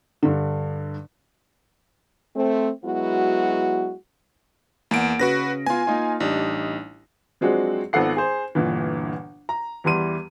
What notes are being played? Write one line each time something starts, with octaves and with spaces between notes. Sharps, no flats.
G2 D3
A3 C4
F#3 G#3 B3 E4 F#4
E2 A#3 F#5 D7
C#3 F#4 B4 A#6
B3 F4 G#5
A#3 D#4 F4
A1 G3 D4 D#4
F3 F#3 G#3 C4 D4 F#4
G#1 F3 B3 A4 F#5 C7
G#4 C5
G1 A#2 D3 E3
A#5
E2 E3 G3 C6 D#7